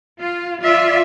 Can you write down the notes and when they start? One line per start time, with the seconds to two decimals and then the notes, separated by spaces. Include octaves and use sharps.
0.20 F4
0.61 F4 D5 E5